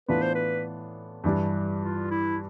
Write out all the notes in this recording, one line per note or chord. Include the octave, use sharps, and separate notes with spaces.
A2 E3 B3 D4 F4 B4
C5
B4
G2 E3 G3 D4
F4
E4